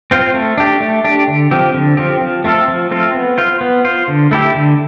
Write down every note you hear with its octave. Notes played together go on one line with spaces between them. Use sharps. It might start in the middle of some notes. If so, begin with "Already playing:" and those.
C4 F4 C5
A3
D4 G4
A3
D4 G4
D3
F3 C4 G4
D3
F3 C4 G4
F3
A3 C4 F4 A4
F3
A3 C4 F4 A4
B3
F4 C5
B3
F4 C5
D3
A3 E4 G4
D3